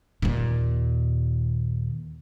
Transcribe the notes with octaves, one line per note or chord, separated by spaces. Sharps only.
D#2 A#2